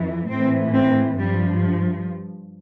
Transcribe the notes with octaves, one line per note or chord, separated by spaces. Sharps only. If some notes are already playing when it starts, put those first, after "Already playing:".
Already playing: F2 E3
A2 E3 C4
C4
G2 F3 G3